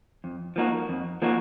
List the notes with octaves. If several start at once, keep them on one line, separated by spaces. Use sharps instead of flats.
F2
F3 A#3 D#4 F#4
F2
F3 A#3 D#4 F#4